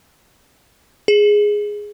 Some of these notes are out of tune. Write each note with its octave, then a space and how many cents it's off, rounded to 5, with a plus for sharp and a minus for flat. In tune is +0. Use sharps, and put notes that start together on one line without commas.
G#4 +0